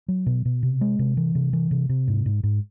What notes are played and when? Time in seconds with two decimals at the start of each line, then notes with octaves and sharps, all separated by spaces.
0.08 F#3
0.26 B2
0.45 B2
0.63 C3
0.81 G#3
0.99 C3
1.17 E3
1.35 C3
1.53 E3
1.71 C3
1.89 C3
2.08 G#2
2.26 G#2
2.43 G#2